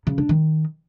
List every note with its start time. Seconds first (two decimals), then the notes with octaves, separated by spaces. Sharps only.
0.07 C#3
0.18 D4
0.29 D#3